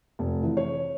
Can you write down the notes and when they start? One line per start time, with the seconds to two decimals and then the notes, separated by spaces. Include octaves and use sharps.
0.19 F1
0.43 E3
0.57 C#5